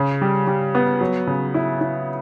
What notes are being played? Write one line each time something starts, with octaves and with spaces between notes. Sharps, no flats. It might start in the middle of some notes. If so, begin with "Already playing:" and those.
Already playing: C#3
G3
G3
B3
F#3
C#3
E4
E4